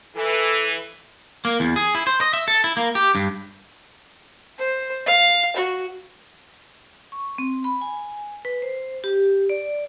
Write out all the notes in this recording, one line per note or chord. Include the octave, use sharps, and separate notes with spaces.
E3 A4
A#3
E2
G#4
E4
C5
D#5
E5
A4
E4
A#3
G4
G2
C5
F5
F#4
C#6
C4
B5
G#5
B4
C5
G4
D5